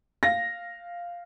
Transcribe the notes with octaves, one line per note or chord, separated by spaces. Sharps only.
F5 A#6